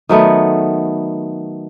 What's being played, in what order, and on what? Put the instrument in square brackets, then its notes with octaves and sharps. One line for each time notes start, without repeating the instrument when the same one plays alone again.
[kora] D#3 F#3 A3 B3